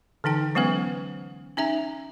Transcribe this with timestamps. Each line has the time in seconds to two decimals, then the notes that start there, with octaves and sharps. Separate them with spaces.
0.24 D3 E3 D#4 G5
0.55 F#3 G#3 B3 C#4 B4
1.57 C#4 D#4 E5 A#5